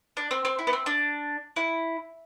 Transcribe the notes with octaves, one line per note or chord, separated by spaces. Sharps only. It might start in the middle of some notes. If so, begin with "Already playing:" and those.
D4
C4
C4
E4
B3
C4
D4
E4